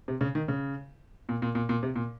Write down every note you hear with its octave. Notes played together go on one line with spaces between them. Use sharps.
C3
C#3
D#3
C#3
A#2
A#2
A#2
A#2
C3
A#2